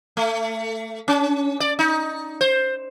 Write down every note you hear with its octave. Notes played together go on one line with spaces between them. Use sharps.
A3
C#4
D5
D#4
C5